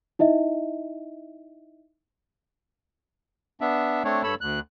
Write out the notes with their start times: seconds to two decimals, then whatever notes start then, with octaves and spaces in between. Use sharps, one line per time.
0.19 D#4 E4 D#5 E5
3.61 B3 D4 E5
4.04 A3 C4 D4 C#5
4.23 G2 A4 C#5 B5 E6
4.41 D2 F#6